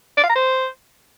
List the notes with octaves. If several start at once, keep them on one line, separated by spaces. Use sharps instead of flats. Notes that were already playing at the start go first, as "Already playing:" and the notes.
D5
F5
A#5
C5